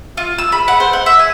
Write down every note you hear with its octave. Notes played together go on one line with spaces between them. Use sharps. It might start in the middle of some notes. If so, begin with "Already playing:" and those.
F4
E6
B5
F#5
C5
F#5
E5
G#5